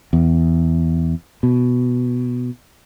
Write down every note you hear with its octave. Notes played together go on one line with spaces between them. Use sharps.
E2
B2